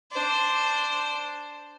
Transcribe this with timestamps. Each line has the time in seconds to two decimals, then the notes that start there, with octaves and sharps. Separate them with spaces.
0.12 D4 C5